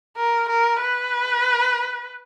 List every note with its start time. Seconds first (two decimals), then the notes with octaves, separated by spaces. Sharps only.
0.17 A#4
0.49 A#4
0.80 B4